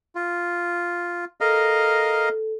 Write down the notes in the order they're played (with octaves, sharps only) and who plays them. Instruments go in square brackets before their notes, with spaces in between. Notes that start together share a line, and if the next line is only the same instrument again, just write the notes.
[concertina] F4
[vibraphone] A4 [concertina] A#4 D#5 F5